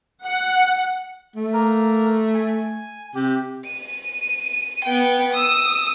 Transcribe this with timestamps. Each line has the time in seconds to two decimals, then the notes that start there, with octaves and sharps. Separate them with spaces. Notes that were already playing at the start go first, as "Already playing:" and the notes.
0.25 F#5
1.36 A3
1.53 A#3 A#4
2.35 G#5
3.15 C3 G4
3.67 D#7
4.84 B3 G5
5.33 D#6 E6